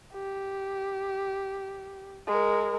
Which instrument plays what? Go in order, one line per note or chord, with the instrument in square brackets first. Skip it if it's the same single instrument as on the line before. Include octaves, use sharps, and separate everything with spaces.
[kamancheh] G4
G#3 A#4